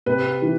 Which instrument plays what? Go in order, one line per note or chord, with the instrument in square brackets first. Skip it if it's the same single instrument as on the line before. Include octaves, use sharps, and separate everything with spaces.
[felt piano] C3 B4
E3